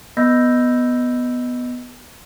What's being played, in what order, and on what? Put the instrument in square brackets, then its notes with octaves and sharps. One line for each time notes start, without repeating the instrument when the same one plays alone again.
[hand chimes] B3 D#5 B5 E6 G6 A#6